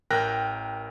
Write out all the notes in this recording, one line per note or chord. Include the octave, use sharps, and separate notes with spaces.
A1 A#4 G5 F#6 A#6